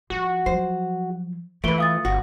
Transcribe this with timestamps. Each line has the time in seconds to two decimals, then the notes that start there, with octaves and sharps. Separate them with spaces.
0.10 F3 F#4
0.46 F3 F#3 C5
1.64 E3 A3 F4 B4 D7 G7
1.78 F5 D#6 A6
2.05 G1 F#4